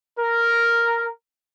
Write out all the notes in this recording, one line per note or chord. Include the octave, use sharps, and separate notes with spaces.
A#4